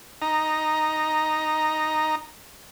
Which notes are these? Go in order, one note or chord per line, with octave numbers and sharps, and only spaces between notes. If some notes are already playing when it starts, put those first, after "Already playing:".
D#4 A#5